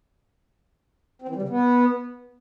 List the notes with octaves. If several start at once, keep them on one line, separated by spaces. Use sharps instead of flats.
C4
E3
G3
C#3
B3